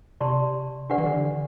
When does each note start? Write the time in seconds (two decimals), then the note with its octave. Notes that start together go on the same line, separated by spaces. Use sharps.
0.21 C3 G4 D5 A5 C6
0.90 D3 D4 G4 B4 D5 F#5
0.98 E3
1.06 D3